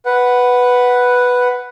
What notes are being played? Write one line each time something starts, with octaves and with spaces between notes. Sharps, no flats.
B4 F#5